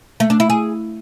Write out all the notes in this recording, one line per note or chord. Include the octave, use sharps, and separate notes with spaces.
A3
D4
E4
G#4